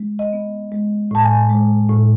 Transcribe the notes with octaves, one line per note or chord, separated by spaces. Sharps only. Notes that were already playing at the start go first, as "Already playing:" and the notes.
Already playing: G#3
D#5
B3
G#3
A2 A5
G#5
G#3
A2